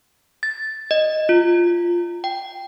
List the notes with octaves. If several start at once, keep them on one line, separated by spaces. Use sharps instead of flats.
A6
D#5
F4
G5